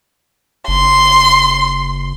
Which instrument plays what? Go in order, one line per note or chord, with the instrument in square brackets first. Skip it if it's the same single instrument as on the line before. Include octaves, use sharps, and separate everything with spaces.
[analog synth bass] F#1 [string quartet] C6